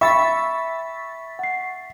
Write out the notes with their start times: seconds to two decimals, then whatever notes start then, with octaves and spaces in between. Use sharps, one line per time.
0.01 E5 G5 B5 C#6 E6 A6 B6
1.39 F#5 C7